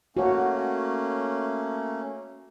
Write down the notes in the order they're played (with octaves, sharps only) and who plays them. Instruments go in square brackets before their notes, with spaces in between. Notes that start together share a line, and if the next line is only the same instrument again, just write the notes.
[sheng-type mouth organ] A3 A#3 C#4 [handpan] F#4 C#5